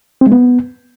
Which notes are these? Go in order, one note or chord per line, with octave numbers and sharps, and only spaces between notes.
C4
G#3
B3